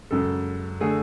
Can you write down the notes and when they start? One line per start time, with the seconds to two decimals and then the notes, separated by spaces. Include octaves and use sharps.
0.11 F#2 C#3 G#3 A4
0.80 D3 A3 G#4